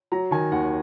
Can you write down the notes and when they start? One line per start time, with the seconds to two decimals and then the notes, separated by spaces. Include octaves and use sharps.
0.12 F#3 A#5
0.31 D#3 G#5
0.51 D#2 F#5